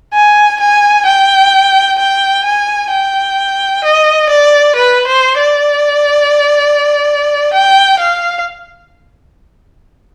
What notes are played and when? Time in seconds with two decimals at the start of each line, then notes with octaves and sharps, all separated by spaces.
0.13 G#5
0.60 G#5
1.06 G5
1.99 G5
2.45 G#5
2.90 G5
3.84 D#5
4.29 D5
4.76 B4
5.07 C5
5.37 D5
7.54 G5
7.99 F5